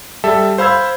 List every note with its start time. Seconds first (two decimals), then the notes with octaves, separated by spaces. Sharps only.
0.24 G3 A4 E5 A5
0.58 C5 F5 B5 E6 G#6